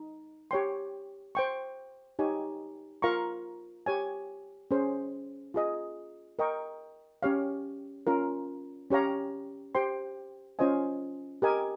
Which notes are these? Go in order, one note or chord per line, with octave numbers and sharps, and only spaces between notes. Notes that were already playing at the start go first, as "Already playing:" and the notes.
Already playing: D#4
G4 C#5 G5 C6
C5 G5 C#6
D#4 G4 C#5 G#5
F4 A#4 F5 A#5 C#6
G4 C#5 G#5
C#4 G#4 C5
F4 G#4 D#5
A#4 D#5 G5 C#6
C#4 G4 C#5 F5
C#4 F4 A#4
C#4 G4 C#5 F5 A#5
G4 C5 G5 C6
C#4 F4 C5 D#5 G#5
G4 A#4 D#5 G#5